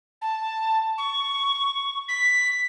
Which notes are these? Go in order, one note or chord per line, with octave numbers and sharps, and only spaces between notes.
A5
C#6
B6